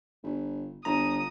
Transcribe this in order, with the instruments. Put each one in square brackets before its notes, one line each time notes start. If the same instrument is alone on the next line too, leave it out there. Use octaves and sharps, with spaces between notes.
[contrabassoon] G1
[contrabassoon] G1 [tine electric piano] A#5 [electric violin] D#6